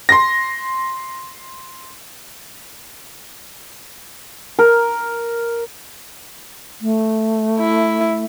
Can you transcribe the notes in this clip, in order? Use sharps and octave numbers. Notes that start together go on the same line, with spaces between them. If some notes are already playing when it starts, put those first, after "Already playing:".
C6 A#6
A#4
A3
E4